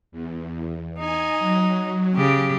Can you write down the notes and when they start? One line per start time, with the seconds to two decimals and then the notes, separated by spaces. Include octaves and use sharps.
0.12 E2
1.00 D#4 G#5
1.40 F#3
2.15 C#3 G4